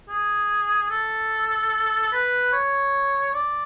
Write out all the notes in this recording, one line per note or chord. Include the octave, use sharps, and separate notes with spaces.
G#4
A4
B4
C#5
D5